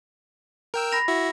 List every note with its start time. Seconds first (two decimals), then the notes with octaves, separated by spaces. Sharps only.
0.74 A#4 G5 E6
0.92 B5 A#6 F7
1.08 E4 F#4 E5